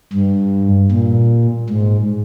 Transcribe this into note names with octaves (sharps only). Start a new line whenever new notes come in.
G2
A#2
G#2